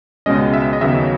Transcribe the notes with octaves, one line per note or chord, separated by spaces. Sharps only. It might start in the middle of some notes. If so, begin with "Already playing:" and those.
C#2 B2 G#3 C#4 D#5
E5
D#5
D#2 C#3 F#3 B3 E5